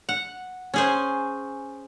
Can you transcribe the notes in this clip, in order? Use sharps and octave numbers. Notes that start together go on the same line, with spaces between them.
F#5
C#4 G#4 C5